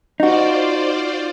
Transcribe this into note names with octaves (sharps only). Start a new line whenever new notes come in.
D#4 F4 F#4 C5 D5